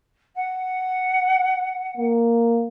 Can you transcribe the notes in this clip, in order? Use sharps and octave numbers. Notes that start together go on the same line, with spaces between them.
F#5
A#3